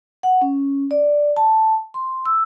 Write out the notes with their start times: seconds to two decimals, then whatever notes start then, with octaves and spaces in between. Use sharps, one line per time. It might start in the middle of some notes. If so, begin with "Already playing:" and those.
0.23 F#5
0.42 C#4
0.91 D5
1.37 A5
1.94 C6
2.26 E6